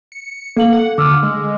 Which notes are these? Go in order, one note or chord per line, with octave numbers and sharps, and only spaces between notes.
C#7
A#3 A4 F5 F#7
F#5
D3 D6 E6 F6
G#3